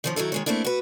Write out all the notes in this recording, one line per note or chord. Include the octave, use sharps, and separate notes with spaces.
D#3 F3 C#4
D#3 F#3 E4 A4
D#3 G#3 C#5
A3 A#3 C4 D4 E4
F#4 B4